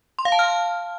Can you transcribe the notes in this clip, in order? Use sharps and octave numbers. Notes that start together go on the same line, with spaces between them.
C6
F5
A5
F6